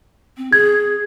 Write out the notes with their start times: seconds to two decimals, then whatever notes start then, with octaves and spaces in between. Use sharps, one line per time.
0.37 C4
0.53 G#4 G#6